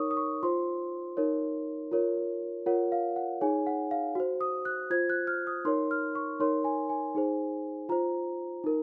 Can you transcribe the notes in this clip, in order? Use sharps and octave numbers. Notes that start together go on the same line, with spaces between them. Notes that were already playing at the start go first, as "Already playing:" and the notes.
Already playing: D#4 A#4 C#5 C#6 D#6
D#6
C#6
F4 C5 C6
D#4 A#4 C#5
F4 A#4 C#5
F4 A#4 C#5 F#5
F5
F#5
D#4 G#4 C#5 G#5
F#5
F5
F#4 C5
D#6
F#6
F4 C5 G#6
F#6
F6
D#6
D#4 A#4 C#5 C6
F6
C#6
D#4 A#4 C#5 C6
G#5
G#5
D#4 G#4 C5
F4 C5 A#5
D#4 A#4